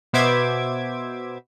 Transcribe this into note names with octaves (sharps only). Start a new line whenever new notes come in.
B2 B3 C5 E5 D6 G#6